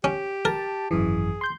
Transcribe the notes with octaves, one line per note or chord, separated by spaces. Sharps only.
C#4 G4
A#4 A5
G#1 F#2 E3 G#4
C6 G6